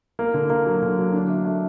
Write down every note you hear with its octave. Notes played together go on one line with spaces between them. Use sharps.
A#3
D3
A#3
F#3
D3
F#3
D4
A3
A3